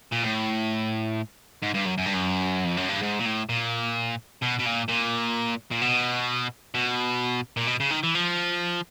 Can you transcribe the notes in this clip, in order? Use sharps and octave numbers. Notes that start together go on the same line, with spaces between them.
A#2
A2
G#2
G2
F#2
F#2
G2
F#2
F2
F#2
G2
G#2
A#2
A2
A#2
B2
B2
A#2
A#2
A#2
B2
B2
A#2
B2
C#3
D#3
E3
F3